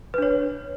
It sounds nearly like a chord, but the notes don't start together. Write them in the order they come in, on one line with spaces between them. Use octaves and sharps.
B4 D4 C#5